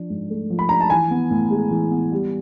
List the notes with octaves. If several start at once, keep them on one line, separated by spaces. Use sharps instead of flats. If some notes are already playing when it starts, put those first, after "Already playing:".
Already playing: F3 D4
G#2
A3
F3
B5
D4 A#5
A5
E3 G#5
B3
A2
G#3
E3
B3
G3